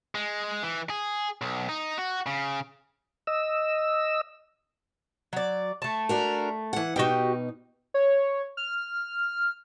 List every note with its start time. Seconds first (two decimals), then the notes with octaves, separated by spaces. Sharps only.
0.15 G#3
0.63 E3
0.90 G#4
1.41 B1
1.69 D#4
1.98 F#4
2.26 C#3
3.27 D#5 E6
5.33 F#3 D5
5.82 A3 A5
6.09 D4 F#4 A#4
6.73 E3 F#5
6.96 B2 D#4 F#4 G4 G5
7.94 C#5
8.57 F6